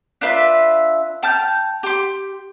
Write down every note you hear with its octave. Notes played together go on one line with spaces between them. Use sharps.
D4 F4 B4 E5
G5 A5 F6 G6
G4 C6